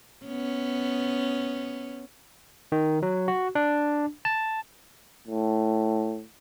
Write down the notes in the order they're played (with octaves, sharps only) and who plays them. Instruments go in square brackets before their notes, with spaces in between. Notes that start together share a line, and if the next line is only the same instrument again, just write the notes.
[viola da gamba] B3 C#4
[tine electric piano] D#3
F#3
F#4
D4
A5
[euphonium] A2